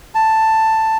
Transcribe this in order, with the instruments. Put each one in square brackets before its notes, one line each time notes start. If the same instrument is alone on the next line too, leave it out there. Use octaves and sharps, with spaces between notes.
[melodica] A5